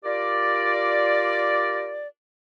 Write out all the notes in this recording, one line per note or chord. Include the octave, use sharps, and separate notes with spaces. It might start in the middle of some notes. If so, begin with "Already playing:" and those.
F4 G4 A#4 D5